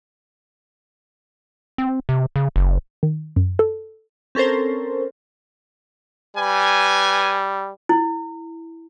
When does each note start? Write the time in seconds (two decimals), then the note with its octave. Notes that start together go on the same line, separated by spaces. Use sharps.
1.78 C4
2.09 C3
2.36 C#3
2.56 F#1
3.03 D#3
3.36 F#2
3.59 A4
4.35 C4 C#4 A4 A#4 C5
6.37 G3 B4 G#5
7.89 E4